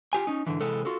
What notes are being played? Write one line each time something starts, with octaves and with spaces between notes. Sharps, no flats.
F4 G4 G#5
C#4 D#4
G#2 D3 E3
C3 E3 G#3 A4
F4 F#4 A4